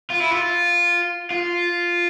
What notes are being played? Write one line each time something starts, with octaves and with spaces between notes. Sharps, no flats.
F4
E4
F4
F4